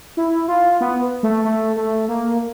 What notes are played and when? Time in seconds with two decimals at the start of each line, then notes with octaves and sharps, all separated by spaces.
0.17 E4
0.48 F4
0.81 B3
1.23 A3
1.45 A3
1.76 A3
2.08 A#3